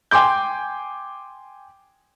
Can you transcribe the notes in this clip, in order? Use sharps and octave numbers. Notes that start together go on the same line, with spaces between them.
G5 G#5 C6 D6 G6